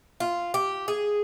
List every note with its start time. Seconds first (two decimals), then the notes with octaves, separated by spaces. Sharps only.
0.20 F4
0.54 G4
0.88 G#4